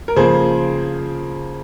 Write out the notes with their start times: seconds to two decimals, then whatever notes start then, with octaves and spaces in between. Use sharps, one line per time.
0.08 A#4
0.16 C#3 F3 A#3 G#4 C5